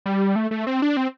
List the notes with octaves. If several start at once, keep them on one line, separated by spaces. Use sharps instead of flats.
G3
A3
A3
C4
D4
C4